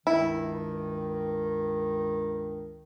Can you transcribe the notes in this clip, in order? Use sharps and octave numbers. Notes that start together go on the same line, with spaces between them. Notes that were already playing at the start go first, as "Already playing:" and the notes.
C#2 G2 D#3 E4